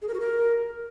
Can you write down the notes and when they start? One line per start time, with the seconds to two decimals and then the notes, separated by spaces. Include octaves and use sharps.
0.02 G#4
0.08 A#4
0.14 F#4
0.20 A#4